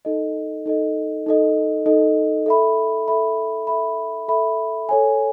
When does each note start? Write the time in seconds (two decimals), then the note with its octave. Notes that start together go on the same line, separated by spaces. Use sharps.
0.05 D#4 A4 D#5
0.66 D#4 A4 D#5
1.26 D#4 A4 D#5
1.86 D#4 A4 D#5
2.46 A4 E5 B5
3.08 A4 E5 B5
3.67 A4 E5 B5
4.28 A4 E5 B5
4.89 A4 C#5 G#5